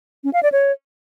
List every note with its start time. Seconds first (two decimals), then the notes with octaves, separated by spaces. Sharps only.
0.24 C#4
0.33 F5
0.43 D5
0.52 C#5